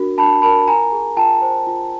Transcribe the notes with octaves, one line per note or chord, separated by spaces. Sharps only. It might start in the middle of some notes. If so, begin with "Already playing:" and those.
Already playing: D4 F#4 A#4
D4 A5 B5
A#4 A5 B5
F4 G#5 A#5
G#4
F4 G5 A5
C5
F4